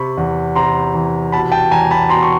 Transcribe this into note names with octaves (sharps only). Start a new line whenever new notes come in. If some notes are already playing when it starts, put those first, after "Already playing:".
Already playing: C3 B5 C#6
E2
C3 A#5 C6
E3
B2 A5 B5
G5 A5
E2 G#5 A#5
A5 B5
B2 A#5 C6
C#6